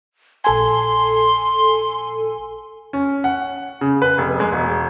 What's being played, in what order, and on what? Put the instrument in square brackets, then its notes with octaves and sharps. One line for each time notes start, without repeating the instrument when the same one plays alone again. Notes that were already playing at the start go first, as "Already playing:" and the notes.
[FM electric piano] A#1 A4 G#5 [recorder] C6
[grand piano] C#4
F#5
C#3
B4
F1
G#3
E1